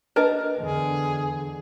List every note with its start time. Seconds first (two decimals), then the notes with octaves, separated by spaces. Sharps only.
0.16 D4 A#4 B4 D#5 A#5
0.59 E2 D3 G#4